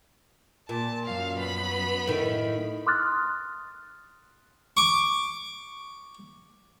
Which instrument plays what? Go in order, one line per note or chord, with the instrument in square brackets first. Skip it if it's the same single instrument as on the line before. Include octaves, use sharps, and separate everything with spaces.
[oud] A#2 [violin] A5
[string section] F#2 [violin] F5
[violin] B3 B5
[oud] A2 D#3
[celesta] C6 D6 D#6 F6 F#6 A6
[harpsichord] C#6 D6